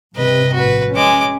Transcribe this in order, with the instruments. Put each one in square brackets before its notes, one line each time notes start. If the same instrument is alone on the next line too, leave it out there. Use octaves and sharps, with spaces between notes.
[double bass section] G2 C3 [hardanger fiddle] B4 D#5
[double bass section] A#1 A2 [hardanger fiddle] F#4 B4
[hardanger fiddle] G#3 D6 [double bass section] C#4